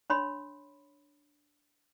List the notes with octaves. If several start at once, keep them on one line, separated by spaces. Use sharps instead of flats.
D4 C#5 B5 C6